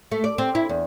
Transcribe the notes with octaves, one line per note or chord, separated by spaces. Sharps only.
A3
D5
C4
E4
E2